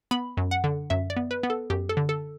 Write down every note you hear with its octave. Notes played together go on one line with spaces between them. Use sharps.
B3 B5
F#2
F#5
D3
F#2 E5
D5
B3
B4
B3
A4
F#2 G4
A4
D3
A4